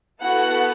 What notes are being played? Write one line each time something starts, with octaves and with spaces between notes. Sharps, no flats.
B3 E4 F#4 A4 F#5